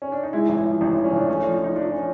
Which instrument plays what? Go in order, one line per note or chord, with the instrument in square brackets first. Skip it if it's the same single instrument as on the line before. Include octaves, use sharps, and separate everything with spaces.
[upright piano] C#4
D4
D#4
G#3 E4
A1
E4
F3
A1 D#4
F3
C#4
A1 D4
A3 C#4
F3 D4
F3 D#4
F3 D4
C#4